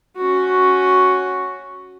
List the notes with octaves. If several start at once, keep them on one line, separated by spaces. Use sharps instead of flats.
C#4 F#4